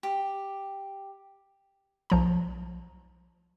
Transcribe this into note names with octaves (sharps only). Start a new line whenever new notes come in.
G4
B1 F3 A#5